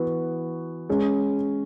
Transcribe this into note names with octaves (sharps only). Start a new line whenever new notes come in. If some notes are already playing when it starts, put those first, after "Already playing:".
Already playing: E3 B3 F#4
G#3 C#4